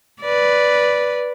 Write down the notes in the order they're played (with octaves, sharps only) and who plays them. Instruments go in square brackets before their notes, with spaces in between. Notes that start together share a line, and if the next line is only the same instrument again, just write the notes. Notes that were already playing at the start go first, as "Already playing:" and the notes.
[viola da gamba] B4 D5